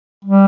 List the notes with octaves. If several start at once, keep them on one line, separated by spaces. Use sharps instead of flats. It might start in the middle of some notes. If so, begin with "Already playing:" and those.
G3